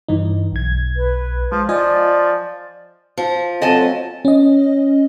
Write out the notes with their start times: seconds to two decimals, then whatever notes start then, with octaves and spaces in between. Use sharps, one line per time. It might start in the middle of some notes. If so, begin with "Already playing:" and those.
0.08 G2 E3 D#4
0.52 B1 G#6
0.97 B4
1.52 F3 G#3
1.69 F3 F4 D5 D#5 G#5
3.17 F3
3.62 F#3 A3 C4 A4 D#5 G#5 A5
4.25 C#4 D#5